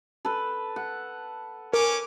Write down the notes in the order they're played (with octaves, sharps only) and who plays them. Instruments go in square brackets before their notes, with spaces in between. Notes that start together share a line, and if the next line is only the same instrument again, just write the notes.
[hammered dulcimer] A4 B4
F#5
[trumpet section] C#4 G#5 D6 [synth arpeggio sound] A#4